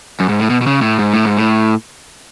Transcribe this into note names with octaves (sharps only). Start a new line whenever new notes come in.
F#2
G#2
A2
B2
B2
C#3
A2
G#2
A2
G#2
A2